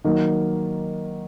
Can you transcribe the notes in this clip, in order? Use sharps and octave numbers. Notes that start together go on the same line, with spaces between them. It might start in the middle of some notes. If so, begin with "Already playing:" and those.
D#3 F#3 A#3